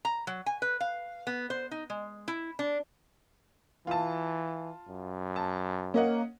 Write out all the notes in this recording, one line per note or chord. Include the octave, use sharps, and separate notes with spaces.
A#5
F#3
G#5
B4
F5
B3
C5
D#4
G#3
E4
D4
E3 F4 A5
F#2
A5
A#3 C#4 D#5 F#5